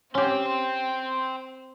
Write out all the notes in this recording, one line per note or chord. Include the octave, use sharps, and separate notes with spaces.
C4 C#4 G4 G5 C6